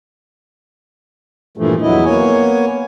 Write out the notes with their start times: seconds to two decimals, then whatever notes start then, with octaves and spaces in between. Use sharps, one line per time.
1.57 G2 A#2 E3 F3 A3
1.82 E2 F#3 B3 E4 D#5
2.05 A#3 B3 C#5 G#5